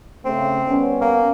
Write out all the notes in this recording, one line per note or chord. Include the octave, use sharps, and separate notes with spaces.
C#3 A3 C4
G3 B3 C#4
A#3